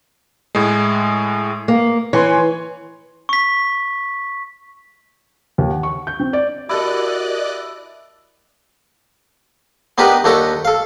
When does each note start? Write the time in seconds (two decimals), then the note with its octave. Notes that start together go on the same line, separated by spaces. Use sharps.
0.55 A2 G#3
1.68 A#3
2.13 E3 C#5 G#5 C6
3.29 C#6 B6
5.58 D#2
5.70 F#5
5.83 C#6
6.07 G6
6.20 C4
6.33 D5
6.69 E4 F#4 G4 A4 A#4 D5 D#5 F#6
9.98 B3 D4 D#4 G4 A#4 B4
10.24 D#2 D4 D#4 A4 A#5 C#6
10.65 A4 F5